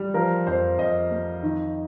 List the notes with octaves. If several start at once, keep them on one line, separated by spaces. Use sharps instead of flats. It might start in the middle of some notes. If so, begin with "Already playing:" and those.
Already playing: G3
F3 A#4
F2 C5
F2 D#5
A#3
D#3